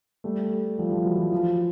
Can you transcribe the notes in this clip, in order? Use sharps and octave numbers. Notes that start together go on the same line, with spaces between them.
G3 A3
F3 G3
F3
E3 F#3
F3
F3